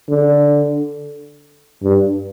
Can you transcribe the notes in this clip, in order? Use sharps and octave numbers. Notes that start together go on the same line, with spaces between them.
D3
G2